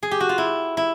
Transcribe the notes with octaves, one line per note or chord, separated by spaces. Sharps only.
G#4
G4
F#4
F4
E4
E4